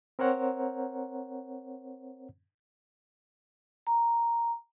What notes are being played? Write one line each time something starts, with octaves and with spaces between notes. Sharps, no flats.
C4 A#4 C5 C#5 F#5 A#5
A#5